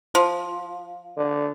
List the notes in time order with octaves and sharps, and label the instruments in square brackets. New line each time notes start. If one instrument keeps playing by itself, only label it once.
[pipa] F3
[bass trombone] D3